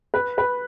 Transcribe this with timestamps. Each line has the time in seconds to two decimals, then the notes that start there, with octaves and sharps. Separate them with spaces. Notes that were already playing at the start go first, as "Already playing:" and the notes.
0.14 B4
0.38 B4